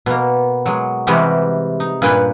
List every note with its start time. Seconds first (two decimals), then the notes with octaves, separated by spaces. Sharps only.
0.06 B2 A#3
0.66 F#3 G#3
1.07 C3 E3 G3 G#3 F#4 G4
1.80 D#4
2.02 G2 A#2 B4 G5 G#5 B5